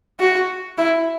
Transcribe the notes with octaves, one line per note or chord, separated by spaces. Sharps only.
F#4
E4